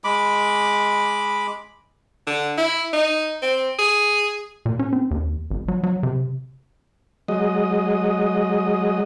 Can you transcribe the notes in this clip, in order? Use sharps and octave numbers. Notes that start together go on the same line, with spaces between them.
G#3 B5 D6
D3
E4
D#4
C4
G#4
A#2
C#4
C4
D#2
G#1
F#3
F#3
C3
F#3 G#3 D#5